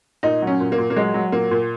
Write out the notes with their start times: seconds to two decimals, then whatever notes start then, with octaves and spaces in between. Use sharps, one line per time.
0.23 A#2 D#4
0.42 F#3 C#4
0.60 A#2
0.72 A#3
0.78 A#2
0.90 A#3
0.97 F#3 G#3
1.14 F#3
1.32 A#2 A#3
1.51 A#2